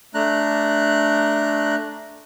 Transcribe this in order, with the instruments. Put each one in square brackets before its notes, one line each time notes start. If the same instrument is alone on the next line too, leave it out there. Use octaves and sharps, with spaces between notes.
[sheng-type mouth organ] A3 D4 A#5 F#6